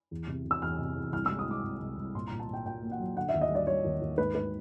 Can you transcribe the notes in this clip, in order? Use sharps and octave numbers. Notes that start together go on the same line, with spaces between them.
E2
C3
C3
E6
E2 F6
C3
E2
C2 F6
G#3 E6
D#6
G#3 D6
C2
C2
C2
A#2 C6
A#2 A#5
A5
A#2
G5
A#2 G5
A#3
F#5
F#3
D3 F#5
E5
D#2
D#5
G3 D5
G3 C#5
D#2
D#2
G#2 B4
G#2 B4